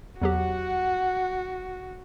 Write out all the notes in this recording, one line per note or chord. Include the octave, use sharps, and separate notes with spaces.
E2 F#3 F#4 G4 F#5